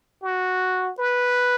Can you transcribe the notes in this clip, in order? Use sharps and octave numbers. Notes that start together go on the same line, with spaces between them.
F#4
B4